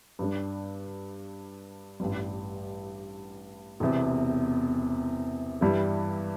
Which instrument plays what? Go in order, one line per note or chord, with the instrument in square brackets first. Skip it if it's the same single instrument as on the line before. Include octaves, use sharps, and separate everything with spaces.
[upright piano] G2 G3 D4
A1 G2 G3
E1 E2 C3
G2 E3 G3 E4